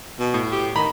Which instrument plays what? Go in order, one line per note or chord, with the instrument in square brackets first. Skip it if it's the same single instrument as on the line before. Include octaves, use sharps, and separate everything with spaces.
[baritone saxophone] B2
[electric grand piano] A2
[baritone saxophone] G4
[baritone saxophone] D#3 [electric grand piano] A#5 B5